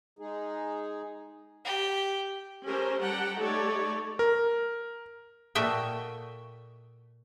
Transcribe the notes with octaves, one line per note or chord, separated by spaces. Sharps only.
G#3 D#4 G#4
G4
C#4 G4 A4 A#4 C5
G3 G4 F#5 G5 A5 A#5
A3 D#4 G4 A4 C#5 D5
A#4
A#2 F#4 A4 D#5 E5 G5